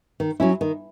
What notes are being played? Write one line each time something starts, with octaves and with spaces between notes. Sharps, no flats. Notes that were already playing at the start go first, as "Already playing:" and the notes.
D#3
F#3 C#4 E4
D#3